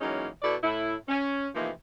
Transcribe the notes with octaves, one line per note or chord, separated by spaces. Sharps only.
E3 F#3 G#3 A#3 C#4 D#4
B2 E4 A4 D5
A2 E4
C#4
C3 E3 F3 A3 A#3 D#4